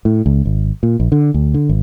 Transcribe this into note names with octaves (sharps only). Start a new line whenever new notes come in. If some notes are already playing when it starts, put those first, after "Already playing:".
A2
C#2
G#1
A#2
A#1
D3
D2
D3
G#1